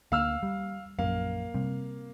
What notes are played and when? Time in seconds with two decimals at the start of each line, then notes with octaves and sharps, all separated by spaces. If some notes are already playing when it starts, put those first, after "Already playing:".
0.12 D2 D3 A#3 F5 E6 F6
0.43 G3
0.99 A#1 F#2 A#3 F5
1.54 C3 G3 C4